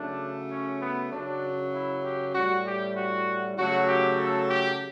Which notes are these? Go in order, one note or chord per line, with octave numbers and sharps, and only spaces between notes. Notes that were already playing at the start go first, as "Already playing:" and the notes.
Already playing: C#3 F#3 A3 D4
C#4
B3
F#2 C#3 F#3 D4
E4
G4
A2 G3 F#4
G4
F#4
C#3 F#3 A3 F#4
G4
A4
G4